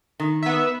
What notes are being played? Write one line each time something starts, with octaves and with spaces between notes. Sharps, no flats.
D#3
B3 E5